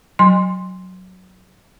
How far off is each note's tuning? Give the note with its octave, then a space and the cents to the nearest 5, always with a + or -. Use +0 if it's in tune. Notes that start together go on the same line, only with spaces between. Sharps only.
F#3 +0 G#5 -40 C6 +0